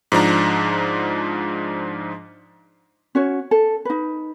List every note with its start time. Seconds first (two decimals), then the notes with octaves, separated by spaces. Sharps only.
0.12 G#2 F3 D4 A#5
3.15 C#4 F#4 C#5
3.51 A4
3.85 D#4 B4